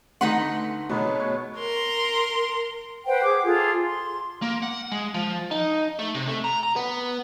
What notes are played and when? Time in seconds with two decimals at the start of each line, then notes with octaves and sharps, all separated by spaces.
0.21 D2 A3 D#4 B4 F#5 C6
0.89 B2 F#3 G#3 A3 B3
1.20 C#5
1.58 A#4 C6
3.06 B4 C5 F#5 G5
3.24 G#4 D6
3.44 F4 G#4 A4
3.84 C6
4.42 A#3
4.62 F#5
4.92 G#3
5.14 F3
5.51 D#4
5.99 A3
6.14 C3
6.28 A3
6.44 A#5
6.63 A#5
6.76 B3